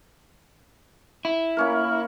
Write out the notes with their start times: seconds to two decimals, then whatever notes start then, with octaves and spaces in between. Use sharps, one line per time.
1.25 E4
1.57 A#3 C#4 A#4